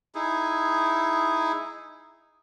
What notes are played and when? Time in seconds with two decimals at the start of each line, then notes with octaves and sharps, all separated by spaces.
0.15 D#4 E4 G#4